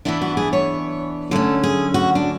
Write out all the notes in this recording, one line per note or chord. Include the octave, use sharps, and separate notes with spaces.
E3 B3 D4 E4
F#4
G#4
C#5
D3 F#3 A3 C#4 A4
G#4
F#4
D4